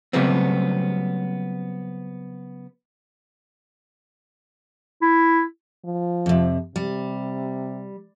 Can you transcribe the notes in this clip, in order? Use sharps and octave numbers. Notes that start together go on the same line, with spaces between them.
C#3 F#3 G3 A3 B3 C4
E4
F3
F2 C3
C3 G3